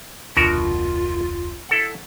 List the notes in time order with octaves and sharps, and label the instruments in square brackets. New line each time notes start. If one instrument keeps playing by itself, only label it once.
[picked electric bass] F1 D2 D4 [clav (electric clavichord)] B2 F#4 A#4 [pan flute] F4
[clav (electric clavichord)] E4 A4 F#5